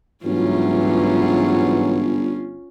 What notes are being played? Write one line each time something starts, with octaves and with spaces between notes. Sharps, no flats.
G1 G#2 E3 F#3 C#4 F4